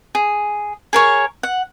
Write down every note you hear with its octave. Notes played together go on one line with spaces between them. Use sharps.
G#4
G#4 A#4 C#5
F#5